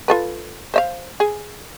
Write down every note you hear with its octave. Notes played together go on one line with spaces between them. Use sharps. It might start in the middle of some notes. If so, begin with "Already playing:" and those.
F4 A4 B4
C5 E5 F5
G#4